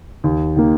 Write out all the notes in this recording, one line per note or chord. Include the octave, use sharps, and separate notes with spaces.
D#2
D#3 A#3